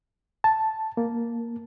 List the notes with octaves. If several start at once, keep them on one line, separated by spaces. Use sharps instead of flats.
A5
A#3